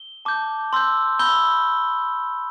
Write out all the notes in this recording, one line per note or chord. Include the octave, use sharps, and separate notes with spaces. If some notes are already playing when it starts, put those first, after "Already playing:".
Already playing: G7
A5 D6 G6
C6 E6 G6
B5 E6 G6 G7